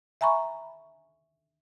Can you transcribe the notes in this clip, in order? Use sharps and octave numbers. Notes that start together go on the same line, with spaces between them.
E5 G#5 A#5 B5 C#6